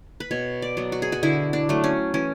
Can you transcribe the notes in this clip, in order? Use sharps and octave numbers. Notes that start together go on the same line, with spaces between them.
B4
B2 C#5
D5
F#3 B3
F#4
G#4
F#4
D3 E4
D4
F#3 A3
C#4
E3 C#4